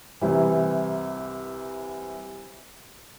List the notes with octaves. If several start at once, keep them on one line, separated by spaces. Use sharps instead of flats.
C2 C3 E3